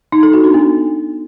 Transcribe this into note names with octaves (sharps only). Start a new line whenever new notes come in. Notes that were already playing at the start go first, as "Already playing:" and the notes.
D#4
A4
F#4
D4
B3